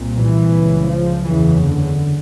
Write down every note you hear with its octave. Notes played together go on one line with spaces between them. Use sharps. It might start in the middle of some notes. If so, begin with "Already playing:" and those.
Already playing: C2 A#2
E3
C#2 C#3
F3
F#1 E2 C#3 E3
D3